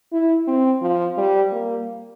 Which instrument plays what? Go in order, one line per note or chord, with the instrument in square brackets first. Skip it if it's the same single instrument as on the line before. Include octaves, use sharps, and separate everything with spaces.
[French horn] E4
C4
F3
G3
A#3